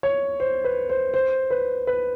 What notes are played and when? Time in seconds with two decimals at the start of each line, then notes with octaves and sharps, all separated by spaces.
0.03 C#5
0.40 C5
0.64 B4
0.89 C5
1.14 C5
1.50 B4
1.87 B4